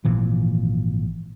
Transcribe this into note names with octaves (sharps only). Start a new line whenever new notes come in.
G#1 A#2 E3 F3